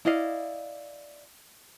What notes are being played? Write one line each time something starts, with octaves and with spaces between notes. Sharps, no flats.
E4 D5 D#5 F5